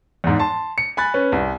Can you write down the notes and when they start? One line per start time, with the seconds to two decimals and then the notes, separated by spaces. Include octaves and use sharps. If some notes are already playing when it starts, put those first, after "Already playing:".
0.24 E2 G#2
0.39 A5 C6
0.78 C#7
0.97 G#5 B5 F#6 A6
1.14 C#4 B4
1.32 C2